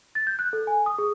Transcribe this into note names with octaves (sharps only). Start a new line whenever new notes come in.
A6
G6
F#6
A4
G#5
D#6
G#4